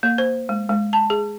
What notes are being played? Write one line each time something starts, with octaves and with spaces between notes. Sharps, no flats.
A#3
C5
G#3
G#3
A5
G#4